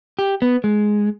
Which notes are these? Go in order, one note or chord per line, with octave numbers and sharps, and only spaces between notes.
G4
B3
G#3